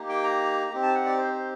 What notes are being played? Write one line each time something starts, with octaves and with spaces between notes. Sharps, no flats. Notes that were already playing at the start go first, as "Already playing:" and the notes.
Already playing: A#3 D#4 G4
G5
A#5
C4 D#4 G4
A5
F#5
D5
C5
C5